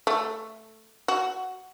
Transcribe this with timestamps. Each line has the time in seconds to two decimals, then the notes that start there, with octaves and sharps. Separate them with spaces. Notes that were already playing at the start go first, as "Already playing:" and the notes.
0.07 A3
1.08 F#4